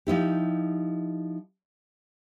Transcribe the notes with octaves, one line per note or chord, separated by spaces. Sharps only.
F3 D#4 E4 G4